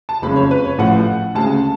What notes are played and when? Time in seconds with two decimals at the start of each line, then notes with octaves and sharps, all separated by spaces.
0.09 A5
0.22 F#1 F2 C#3 G#3 B5
0.36 C#5
0.51 B4
0.65 C#5
0.78 A1 A2 F3 F#5
1.35 D2 C#3 G#3 A5